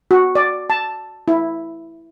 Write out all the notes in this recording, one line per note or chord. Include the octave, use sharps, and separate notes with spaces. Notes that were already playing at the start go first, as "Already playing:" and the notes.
F#4
D5
A5
E4